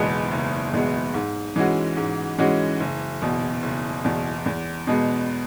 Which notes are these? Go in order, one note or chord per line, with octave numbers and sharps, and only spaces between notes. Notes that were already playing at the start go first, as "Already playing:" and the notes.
Already playing: F#1 E2 B2 G#3 B3
F#1
E2 B2 G#3 B3
G#2
E3 G#3 C#4 F#4
G#2
E3 G#3 C#4 F#4
F#1
E2 B2
F#1
E2 B2
E2
B2 G#3 B3